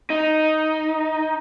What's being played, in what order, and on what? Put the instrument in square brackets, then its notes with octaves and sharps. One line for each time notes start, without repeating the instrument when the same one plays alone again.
[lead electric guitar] D#4